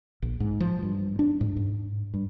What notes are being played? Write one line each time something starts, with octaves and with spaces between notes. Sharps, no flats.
A#1
G#2
F3
G2
D4
G#2
G#2
G2